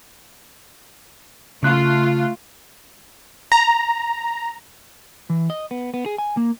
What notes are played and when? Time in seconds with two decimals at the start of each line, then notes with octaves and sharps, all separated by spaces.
1.63 C#3 A3 F4 F#6
3.52 A#5
5.30 E3
5.50 D#5
5.71 B3
5.94 B3
6.06 G#4
6.18 G#5
6.37 A#3